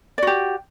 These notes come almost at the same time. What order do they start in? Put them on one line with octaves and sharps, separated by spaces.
D5 F#4 G4